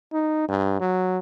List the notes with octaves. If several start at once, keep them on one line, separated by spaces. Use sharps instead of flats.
D#4
G2
F#3